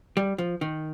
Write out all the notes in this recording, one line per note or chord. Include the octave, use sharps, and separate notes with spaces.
G3
F3
D#3